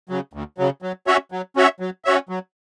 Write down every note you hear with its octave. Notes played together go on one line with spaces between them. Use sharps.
C#3 F#3
D2
C#3 F#3
F#3
C#4 F#4 C#5 E5
F#3
C#4 F#4 C#5 E5
F#3
C#4 F#4 C#5 E5
F#3